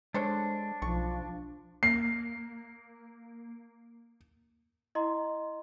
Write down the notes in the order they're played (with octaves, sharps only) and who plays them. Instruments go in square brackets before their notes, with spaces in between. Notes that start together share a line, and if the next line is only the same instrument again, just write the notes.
[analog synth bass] G#3 [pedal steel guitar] D4 [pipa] A4 C5 C#5
[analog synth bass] B1 [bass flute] F3 [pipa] C#6
[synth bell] A#3 [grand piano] C7
[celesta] E4 D#5 A#5 C6